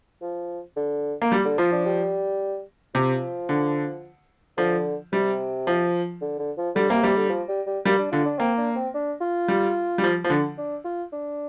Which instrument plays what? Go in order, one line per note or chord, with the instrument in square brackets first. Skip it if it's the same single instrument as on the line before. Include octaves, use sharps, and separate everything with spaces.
[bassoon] F3
D3
[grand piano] A#3
G3
[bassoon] D3
[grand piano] F3 [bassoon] F4
[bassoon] D4
G3
[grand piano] C3 [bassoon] F3
[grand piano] D3
[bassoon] D3 [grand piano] F3
[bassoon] C3 [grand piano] G3
[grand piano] F3
[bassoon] D3
D3
F3
[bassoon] D3 [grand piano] G3
[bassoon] C3 [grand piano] A#3
[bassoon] C3 [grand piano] G3
[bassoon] D3
F3
G3
G3
[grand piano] G3 [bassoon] A#3
[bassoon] D4
[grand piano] D3 [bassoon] F4
[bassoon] D4
[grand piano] A#3 [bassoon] C4
[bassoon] D4
C4
D4
F4
[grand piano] G3
G3
F3
F3
D3
[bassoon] D4
F4
D4